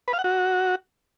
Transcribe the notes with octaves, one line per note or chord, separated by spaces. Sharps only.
B4
F5
F#5
F#4